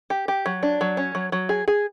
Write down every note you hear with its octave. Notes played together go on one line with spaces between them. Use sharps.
G4
G4
F#3
D4
F#3
C#4
F#3
F#3
G#4
G#4